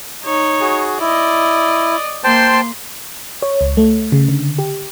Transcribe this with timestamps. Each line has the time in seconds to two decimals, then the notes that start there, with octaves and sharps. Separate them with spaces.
0.24 D#4 C#5
0.61 F#4 G#4
1.00 E4 D5 D#5
2.24 A#3 C5 G5 A5 C6
3.42 C#5
3.61 C#2
3.77 A3
4.12 C#3
4.29 D3
4.59 G4